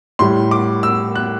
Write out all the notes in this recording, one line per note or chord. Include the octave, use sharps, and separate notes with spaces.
A2 G3 C6
D6
E6
F#6